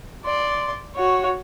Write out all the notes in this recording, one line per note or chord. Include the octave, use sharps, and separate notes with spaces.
D5 C6
F#4 C#5